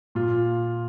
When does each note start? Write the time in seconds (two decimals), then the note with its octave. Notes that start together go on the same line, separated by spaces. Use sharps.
0.15 A#2 F4